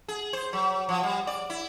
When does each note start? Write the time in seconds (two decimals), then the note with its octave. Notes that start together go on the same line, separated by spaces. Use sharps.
0.08 G#4
0.33 C5
0.53 F#3
0.89 F3
1.03 G3
1.27 D5
1.50 E4